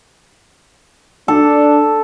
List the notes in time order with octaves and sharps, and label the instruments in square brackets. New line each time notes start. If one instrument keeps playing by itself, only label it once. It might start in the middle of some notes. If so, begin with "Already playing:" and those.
[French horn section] D4 [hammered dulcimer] A4